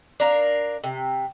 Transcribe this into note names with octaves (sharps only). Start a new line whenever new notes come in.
D4 A#4 F5
C3